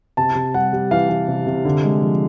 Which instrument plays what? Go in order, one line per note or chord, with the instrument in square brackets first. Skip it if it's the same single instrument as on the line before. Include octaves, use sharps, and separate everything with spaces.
[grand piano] C3 A5
C3
G3 F#5
G3
E3 F5
E3
C3
C3
D3
G#3
F3